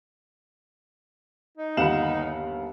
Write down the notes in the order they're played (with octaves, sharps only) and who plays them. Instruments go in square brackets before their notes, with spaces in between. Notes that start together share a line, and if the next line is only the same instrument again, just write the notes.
[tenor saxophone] D#4
[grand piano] G1 F4 [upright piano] D#2 E7 F#7 [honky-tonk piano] F5 F#5 B5